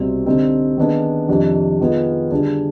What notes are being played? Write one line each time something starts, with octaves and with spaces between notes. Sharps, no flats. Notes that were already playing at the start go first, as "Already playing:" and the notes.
Already playing: C2 B2 G3 C4
D3 G3 C4 D#4
D#3 B3 D4 G#4
F2 C3 D#3 G3 D4
D#3 B3 F4 G#4
D3 G3 D4 G#4